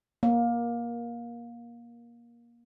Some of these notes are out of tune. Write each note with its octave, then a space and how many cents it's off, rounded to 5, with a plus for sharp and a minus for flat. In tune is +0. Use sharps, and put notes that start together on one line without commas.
A#3 +20